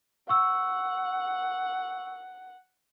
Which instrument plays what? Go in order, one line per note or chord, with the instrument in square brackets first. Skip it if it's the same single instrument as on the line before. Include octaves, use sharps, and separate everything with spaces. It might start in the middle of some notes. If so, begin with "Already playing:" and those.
[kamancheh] F#5 [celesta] C#6 E6